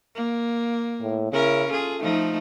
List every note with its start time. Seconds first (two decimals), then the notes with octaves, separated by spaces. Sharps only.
0.15 A#3
1.01 A2
1.32 C#3 C#4 E4 A#4
1.70 F4 G#4 A4
2.02 F3 A3 D#4